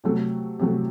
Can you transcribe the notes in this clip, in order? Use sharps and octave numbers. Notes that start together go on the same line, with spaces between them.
C3 F#3 A3
C3 F#3 A3